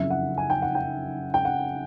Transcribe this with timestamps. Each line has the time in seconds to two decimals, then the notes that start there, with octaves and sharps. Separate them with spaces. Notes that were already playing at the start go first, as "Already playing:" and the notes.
Already playing: F#1 F2 C#3 E5
0.10 F#5
0.38 G#5
0.50 G5
0.62 F#5
0.75 G5
1.34 G5
1.45 F#5